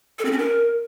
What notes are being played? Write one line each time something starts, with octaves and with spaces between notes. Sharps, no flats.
A4
C4
C#4
A#4